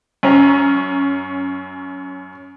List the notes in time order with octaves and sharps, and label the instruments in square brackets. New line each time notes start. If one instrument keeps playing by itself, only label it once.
[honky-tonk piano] F#2 C#4 A#5